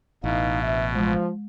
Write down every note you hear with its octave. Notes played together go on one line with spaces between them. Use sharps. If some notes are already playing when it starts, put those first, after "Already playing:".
A1 B2 D#4 E4 F5
D2 E5
F3 G#3